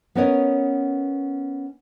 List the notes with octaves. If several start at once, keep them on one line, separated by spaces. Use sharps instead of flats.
B3 C#4 A#4 B4 C#5 D#5